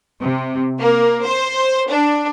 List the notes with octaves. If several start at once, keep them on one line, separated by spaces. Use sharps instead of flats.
C3
A#3
C5
D4